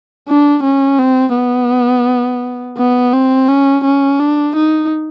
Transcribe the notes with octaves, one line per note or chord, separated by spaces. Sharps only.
D4
C#4
C4
B3
B3
C4
C#4
C#4
D4
D#4